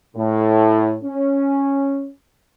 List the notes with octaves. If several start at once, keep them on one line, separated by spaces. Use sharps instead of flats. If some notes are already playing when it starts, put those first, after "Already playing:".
A2
C#4